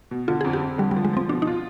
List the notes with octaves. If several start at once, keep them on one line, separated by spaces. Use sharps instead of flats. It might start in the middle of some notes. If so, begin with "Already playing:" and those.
B2
D3 F4
G#4
F2
G4
F2
D3 G3
G3
F3
G#3
F3 C4
B2 D4
D#4
F4